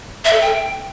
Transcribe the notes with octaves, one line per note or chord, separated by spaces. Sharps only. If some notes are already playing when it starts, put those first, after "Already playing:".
E5
A4
G5